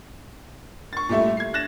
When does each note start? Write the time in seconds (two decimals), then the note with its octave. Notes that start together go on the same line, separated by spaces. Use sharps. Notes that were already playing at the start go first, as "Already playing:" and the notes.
0.93 C#6 A6
1.09 A#2 G3 A3 E4
1.37 G#6 C7
1.54 F#6 A6 A#6 E7